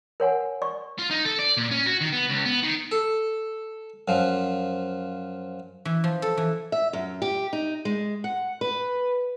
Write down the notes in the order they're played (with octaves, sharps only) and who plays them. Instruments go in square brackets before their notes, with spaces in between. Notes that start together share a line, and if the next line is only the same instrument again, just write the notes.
[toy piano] A#4 C#5 F#5 G#5
D5 C#6
[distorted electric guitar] F4
D#4
A4
D5
A#2
C#4
F#4
D#3
B3
C#2
B3
D#3
[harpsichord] A4
F#2 F3
[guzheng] E3
F3
A4
E3
[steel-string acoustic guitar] E5
F#2
G4
D#4
G#3
F#5
B4